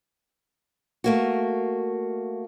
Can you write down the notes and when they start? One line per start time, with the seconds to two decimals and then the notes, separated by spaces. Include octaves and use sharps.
1.04 A3 A#3 F#4